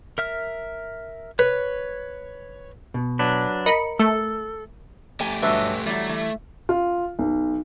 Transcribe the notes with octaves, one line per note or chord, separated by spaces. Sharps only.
A#4 E5 F6
B4 C#5
B2
F#3 D4 B4
A#4 D#5 B5 C#7
A3 A4
A3 G4 G#5
G2 F#3 B4 C#5 D#5 E5
E3 F#3 G3 A3
E3
F4
B1